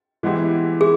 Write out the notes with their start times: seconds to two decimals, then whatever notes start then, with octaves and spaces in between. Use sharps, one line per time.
0.23 E3 G#3 B3 E4 G4
0.81 E4 G#4